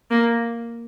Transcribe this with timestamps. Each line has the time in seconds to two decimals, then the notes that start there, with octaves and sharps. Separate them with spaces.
0.11 A#3